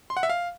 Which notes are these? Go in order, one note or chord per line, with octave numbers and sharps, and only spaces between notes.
C6
F#5
E5
F5